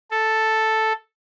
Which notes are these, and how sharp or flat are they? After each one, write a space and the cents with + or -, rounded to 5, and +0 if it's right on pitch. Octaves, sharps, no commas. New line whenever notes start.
A4 +0